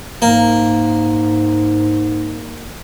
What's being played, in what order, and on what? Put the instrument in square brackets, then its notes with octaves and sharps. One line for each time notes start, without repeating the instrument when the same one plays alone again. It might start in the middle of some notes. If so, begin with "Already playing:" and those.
[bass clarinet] G#2 [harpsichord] A#3